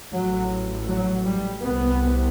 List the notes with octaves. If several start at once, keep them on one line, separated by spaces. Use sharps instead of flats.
A1 A2 F#3
F#3
G3
C2 C3 B3